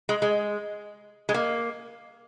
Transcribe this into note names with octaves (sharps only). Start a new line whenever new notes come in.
G#3
G#3
G#3
A#3